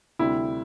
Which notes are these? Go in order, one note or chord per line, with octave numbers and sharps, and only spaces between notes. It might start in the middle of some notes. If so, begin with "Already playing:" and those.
D2 C3 G3 E4